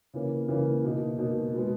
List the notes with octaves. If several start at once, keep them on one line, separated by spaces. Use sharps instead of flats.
C#3 E3 A#3
C#3 E3 A#3
B2 A#3 D#4
B2 A#3 D#4
B2 G#3 B3